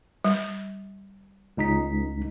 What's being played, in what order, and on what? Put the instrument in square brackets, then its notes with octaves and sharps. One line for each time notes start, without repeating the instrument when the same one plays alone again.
[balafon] G3
[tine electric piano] C#2 D#4 B6